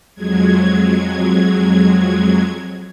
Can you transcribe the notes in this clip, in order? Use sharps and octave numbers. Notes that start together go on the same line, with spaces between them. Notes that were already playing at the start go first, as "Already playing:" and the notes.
F2 F#3 G#3 G#6